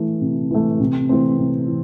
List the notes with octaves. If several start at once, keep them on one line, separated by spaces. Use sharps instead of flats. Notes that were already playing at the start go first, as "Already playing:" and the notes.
Already playing: E3 A3
C3
E3 A3
C3
E3 A3 C4
C3
E3